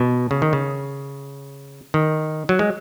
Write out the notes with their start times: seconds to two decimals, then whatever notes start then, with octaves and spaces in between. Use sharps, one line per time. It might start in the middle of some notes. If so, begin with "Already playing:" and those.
Already playing: B2
0.31 C#3
0.42 D#3
0.53 C#3
1.94 D#3
2.49 F#3
2.59 G#3